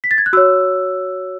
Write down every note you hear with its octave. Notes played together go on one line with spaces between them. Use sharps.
B6
A6
G#6
F#6
F#4 C#5 E6